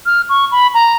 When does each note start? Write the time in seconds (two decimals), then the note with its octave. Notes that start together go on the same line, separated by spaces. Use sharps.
0.06 F6
0.29 C#6
0.51 B5
0.74 A#5